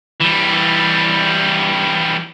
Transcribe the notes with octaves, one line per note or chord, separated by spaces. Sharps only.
E3 G3